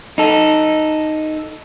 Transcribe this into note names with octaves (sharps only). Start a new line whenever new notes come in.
D#4 A4